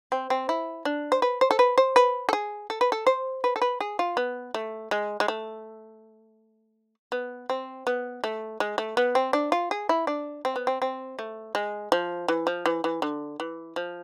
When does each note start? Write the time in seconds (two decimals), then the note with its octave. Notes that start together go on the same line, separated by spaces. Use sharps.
0.12 C4
0.30 C4
0.49 E4
0.85 D4
1.12 C5
1.22 B4
1.41 C5
1.51 A4
1.59 B4
1.78 C5
1.96 B4
2.29 A4
2.33 G#4
2.70 A4
2.81 B4
2.92 A4
3.07 C5
3.44 B4
3.56 A4
3.62 B4
3.81 G#4
3.99 F4
4.17 B3
4.54 A3
4.91 G#3
5.20 G#3
5.28 A3
7.12 B3
7.50 C4
7.87 B3
8.24 A3
8.60 G#3
8.78 A3
8.97 B3
9.15 C4
9.33 D4
9.52 F4
9.71 G#4
9.89 E4
10.07 D4
10.45 C4
10.56 B3
10.67 C4
10.82 C4
11.19 A3
11.55 G#3
11.92 F3
12.28 E3
12.47 F3
12.66 E3
12.84 E3
13.02 D3
13.40 E3
13.76 F3